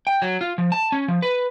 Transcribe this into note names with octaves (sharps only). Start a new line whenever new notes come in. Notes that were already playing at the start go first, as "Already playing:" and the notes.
G5
F#3
F4
F3
A5
C#4
F3
B4